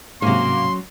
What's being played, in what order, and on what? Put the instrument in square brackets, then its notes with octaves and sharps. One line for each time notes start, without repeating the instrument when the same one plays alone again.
[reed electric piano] G#2 C3 [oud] F#3 C#4 [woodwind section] A#3 [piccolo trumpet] C6